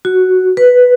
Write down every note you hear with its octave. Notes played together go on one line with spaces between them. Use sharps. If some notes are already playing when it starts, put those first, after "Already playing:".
F#4
B4